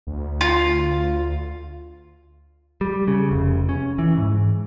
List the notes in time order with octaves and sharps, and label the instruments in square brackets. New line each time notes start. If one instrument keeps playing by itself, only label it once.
[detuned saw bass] D2
[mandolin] F4
[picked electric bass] G3
C#3
F1
C#4
E3
G#2